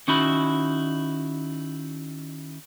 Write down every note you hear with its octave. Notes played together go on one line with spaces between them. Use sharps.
D#3 C#4 D#4 E4 F#4 B5